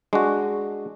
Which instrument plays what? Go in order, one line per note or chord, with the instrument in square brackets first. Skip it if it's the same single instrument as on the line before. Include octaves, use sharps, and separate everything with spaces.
[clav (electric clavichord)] G#3 D4 F#4